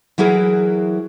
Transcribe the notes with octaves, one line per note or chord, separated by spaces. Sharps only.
E3 F#3 E4 G#4 A#4